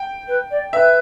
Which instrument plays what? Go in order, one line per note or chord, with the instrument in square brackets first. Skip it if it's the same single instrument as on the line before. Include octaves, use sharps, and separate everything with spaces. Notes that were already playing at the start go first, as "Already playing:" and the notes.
Already playing: [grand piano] G5
[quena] B4
D5
[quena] B4 [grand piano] E5